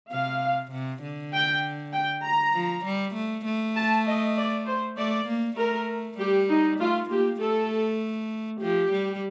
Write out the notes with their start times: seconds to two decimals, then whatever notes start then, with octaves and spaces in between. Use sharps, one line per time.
0.11 C3 F5
0.72 C3
1.02 D3
1.33 G5
1.94 G5
2.24 A#5
2.54 F3
2.85 G3
3.15 A3
3.45 A3
3.76 A5
4.06 D#5
4.37 D5
4.66 C5
4.97 A3 D5
5.28 A#3
5.57 A3 A#4
6.18 G3 G4
6.49 D#4
6.79 A3 F4
7.09 A#3 G4
7.40 A3 A4
8.61 F3 G4
8.92 G3